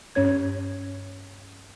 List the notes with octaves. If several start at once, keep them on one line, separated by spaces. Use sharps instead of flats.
G2 C#4 C#5 G#6